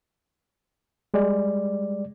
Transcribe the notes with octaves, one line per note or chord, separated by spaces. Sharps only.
G3 G#3 D5